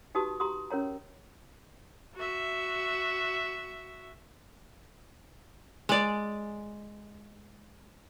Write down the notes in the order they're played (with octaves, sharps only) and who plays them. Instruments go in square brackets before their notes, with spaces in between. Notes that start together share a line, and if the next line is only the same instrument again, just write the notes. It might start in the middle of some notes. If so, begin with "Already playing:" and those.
[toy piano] D#4 F#4 G4 B4 A5 D#6
G4 A#5 C6 D#6
C#4 A#4 C#5 A#5
[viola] F#4 E5
[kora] G#3 D5